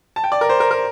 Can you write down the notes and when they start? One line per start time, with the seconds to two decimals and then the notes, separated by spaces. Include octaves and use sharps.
0.16 A5
0.24 G5
0.32 D5
0.41 A#4
0.49 C5
0.60 A#4
0.71 A#4